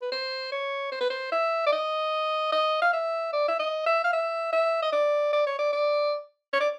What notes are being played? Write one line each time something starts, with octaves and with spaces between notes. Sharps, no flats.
B4
C5
C#5
C5
B4
C5
E5
D5
D#5
D#5
F5
E5
D5
E5
D#5
E5
F5
E5
E5
D#5
D5
D5
C#5
D5
D5
C#5
D5